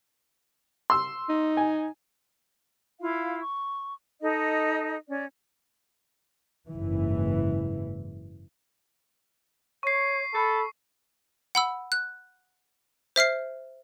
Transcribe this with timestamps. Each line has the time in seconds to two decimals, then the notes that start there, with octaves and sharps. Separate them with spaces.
0.90 C6 E6
1.29 D#4
1.57 G#5
3.00 E4 F4 F5
3.40 C#6
4.22 D#4 A4 D#5
5.09 C#4 D5
6.70 F#1 G#2 E3
9.83 C#5 C#6 C7
10.34 A4 B5
11.55 F#5 B5 E6
11.92 F#6
13.16 C5 E5 F6 C7